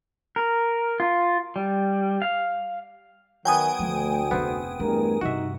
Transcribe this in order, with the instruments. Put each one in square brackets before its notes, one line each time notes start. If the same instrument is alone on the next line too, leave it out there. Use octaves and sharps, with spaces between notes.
[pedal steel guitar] A#4
F4
G3
F5
[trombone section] D#3 [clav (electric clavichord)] F#3 B3 [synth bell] G5 G#5 D#6
[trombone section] D2 [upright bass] F3 A3
[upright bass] F1 C#3 [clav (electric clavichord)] B3 C4
[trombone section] E2 G2 A#4 [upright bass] A3
[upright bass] G2 C3 [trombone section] D#4 [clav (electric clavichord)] F#4 E5